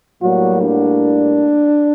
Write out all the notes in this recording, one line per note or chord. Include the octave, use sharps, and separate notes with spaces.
A2 F#3 G3 A#3 F#4
D4